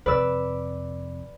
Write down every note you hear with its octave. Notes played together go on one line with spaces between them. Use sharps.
F2 C3 B4 D5 E6